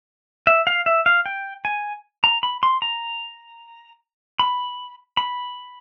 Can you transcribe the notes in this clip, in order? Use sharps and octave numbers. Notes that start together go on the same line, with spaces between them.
E5
F5
E5
F5
G5
G#5
A#5
B5
C6
A#5
B5
B5